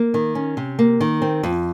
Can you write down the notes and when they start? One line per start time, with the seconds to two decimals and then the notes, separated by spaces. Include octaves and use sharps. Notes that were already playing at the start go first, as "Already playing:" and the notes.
Already playing: A#3
0.14 D#3
0.35 C#4
0.57 C3
0.79 A#3
1.01 D#3
1.22 C4
1.43 F2